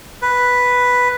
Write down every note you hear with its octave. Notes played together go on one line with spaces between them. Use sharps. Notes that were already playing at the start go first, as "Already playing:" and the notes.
B4